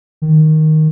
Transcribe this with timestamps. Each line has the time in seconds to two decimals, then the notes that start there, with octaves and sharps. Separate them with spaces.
0.22 D#3